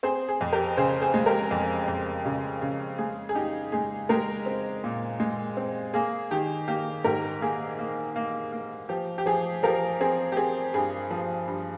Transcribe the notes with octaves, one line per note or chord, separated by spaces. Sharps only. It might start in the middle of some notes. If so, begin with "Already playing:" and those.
C4 G#4 C5
G#4
F2
G4 A#4
C#3 G#4 C5
G#4 C5
G#3
G4 A#4
F2
F2
C#3
C#3
G#3 G#4
G#4
D#4 G4
G#3 G#4
G#3 G4 A#4
C4
A#2
G#3
C4
A#3 G#4
D#3 G4
A#3 G4
G#2 G4 A#4
A#3 G#4
A#3
A#3
A#3
F3 G4
G4
F3 G#4
F3 G4 A#4
C4 G#4
G4
C4 G#4
G2 G#4
F3
G2